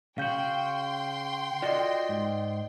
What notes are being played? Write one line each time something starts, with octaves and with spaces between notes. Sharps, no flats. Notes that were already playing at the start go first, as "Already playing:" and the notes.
C#3 F#4 F5 G5 C6 G6
F4 F#4 A4 D5 D#5
G#2